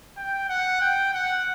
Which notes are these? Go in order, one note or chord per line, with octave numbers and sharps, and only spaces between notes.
G5
F#5
G5
F#5